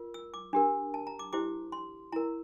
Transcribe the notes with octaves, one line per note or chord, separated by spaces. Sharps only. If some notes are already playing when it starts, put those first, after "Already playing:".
Already playing: F4 A#4
E6
D6
D4 G4 A#4
A5
A#5
D6
E4 G4 C5 D6
C6
E4 A#4 A#5